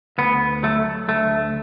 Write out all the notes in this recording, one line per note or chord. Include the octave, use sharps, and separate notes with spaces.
D2 B3
F#3 A3
D2 A3